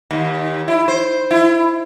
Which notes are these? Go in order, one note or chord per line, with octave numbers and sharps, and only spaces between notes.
D#2
E4
C5
E4